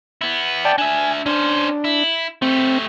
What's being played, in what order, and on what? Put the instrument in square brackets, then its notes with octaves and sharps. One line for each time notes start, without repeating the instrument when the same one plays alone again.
[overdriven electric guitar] B3 E4
[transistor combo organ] D5 G5 A5
[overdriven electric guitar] D4 E5 [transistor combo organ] G#5
[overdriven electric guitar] C#4 C5 [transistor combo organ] D4
[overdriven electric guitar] E4
[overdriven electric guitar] A3 G4 [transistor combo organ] C4